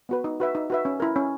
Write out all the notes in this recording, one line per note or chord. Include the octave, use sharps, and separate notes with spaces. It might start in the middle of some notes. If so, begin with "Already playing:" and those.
B3 F#4 B4
D#4
F#4 B4 E5
D#4
F#4 B4 E5
C#4
E4 A#4
C#4